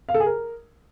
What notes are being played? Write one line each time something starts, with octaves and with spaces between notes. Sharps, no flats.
F5
A4
G#4
A#4